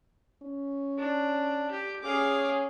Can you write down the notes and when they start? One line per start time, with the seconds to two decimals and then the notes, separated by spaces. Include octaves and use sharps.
0.43 C#4
0.98 D4
1.71 G4
2.03 C#4 G#4 F5 D6